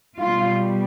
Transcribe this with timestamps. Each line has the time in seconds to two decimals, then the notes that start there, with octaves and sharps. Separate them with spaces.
0.18 B2 G3 F4